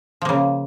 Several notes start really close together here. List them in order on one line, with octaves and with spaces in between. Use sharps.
F3 A#3 C#3